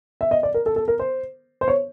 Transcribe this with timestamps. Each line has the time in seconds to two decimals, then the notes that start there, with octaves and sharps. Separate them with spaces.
0.21 E5
0.31 D#5
0.43 D5
0.54 A#4
0.66 A4
0.76 A4
0.88 A#4
0.99 C5
1.61 C5
1.68 C#5